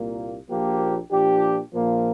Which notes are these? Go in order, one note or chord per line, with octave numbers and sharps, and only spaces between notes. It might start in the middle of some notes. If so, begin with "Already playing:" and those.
Already playing: C2 A#2 A#3
A#1 A#2 F3 A#3 G4
A#2 F3 D4 G4
A#1 A#2 F3 A#3